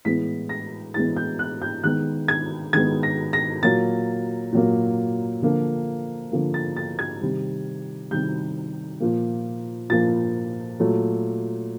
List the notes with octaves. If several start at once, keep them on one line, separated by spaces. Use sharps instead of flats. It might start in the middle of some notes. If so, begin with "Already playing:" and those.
A2 E3 G#3 B3 B6
A#6
A2 E3 G#3 B3 A6
G6
F#6
G6
D#3 G#3 B3 F#6
G#6
D#3 G#3 B3 G#6
A#6
A#6
A#2 F#3 A#3 A6
A#2 F#3 A#3
D3 F3 A#3
D3 F3 A#3
A6
A6
G#6
C3 D#3 G3
C3 D#3 G3 G6
A#2 F3 A#3
A#2 F3 A#3 A6
A#2 F#3 A3